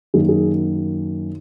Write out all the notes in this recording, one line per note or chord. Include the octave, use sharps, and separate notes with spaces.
F#2 D#3 A#3 G#4
G#4